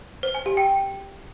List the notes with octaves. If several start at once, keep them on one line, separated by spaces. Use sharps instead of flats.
C5
G#5
G4
G5